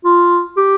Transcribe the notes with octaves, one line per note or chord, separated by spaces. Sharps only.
F4
G4